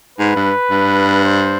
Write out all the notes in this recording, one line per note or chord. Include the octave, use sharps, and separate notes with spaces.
G#2 B4
G2
G2
C5